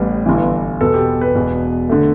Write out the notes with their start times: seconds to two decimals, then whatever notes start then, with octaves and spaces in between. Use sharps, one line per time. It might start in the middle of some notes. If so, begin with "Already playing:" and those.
Already playing: A1 A2 G3 B3
0.26 G1 G2 E3
0.81 E2 B2 B3 A4
0.94 G4
1.21 B4
1.35 E1 E2 B2
1.89 D3 A3